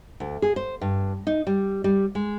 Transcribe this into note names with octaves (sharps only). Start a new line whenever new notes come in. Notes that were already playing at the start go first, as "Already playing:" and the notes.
D2
G#4
C5
G2
D#4
G3
G3
G#3